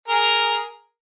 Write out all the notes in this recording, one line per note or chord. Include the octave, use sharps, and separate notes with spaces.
G#4 A#4